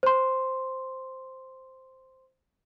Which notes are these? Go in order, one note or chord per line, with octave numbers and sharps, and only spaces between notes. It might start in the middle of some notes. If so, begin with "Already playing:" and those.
C5 C6